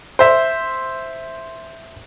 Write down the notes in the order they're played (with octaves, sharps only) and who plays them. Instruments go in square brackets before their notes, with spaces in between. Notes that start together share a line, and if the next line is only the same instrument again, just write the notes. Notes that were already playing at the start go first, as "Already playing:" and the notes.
[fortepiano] C5 E5